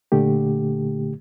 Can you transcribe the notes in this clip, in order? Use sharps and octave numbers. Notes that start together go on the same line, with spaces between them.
A#2 D3 A3 G4